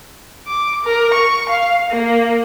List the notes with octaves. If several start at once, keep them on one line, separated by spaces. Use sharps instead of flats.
D6
A#4
C#6
F5
A#3